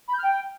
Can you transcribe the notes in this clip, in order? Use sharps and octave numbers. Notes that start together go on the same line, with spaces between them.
B5
G6
F6
G5